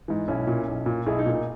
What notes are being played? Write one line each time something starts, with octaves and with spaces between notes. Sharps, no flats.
G#2 E3
B1 C#4 E4
A#2
B1
A#2
B1 E4 G#4
D#4
A#2
D#4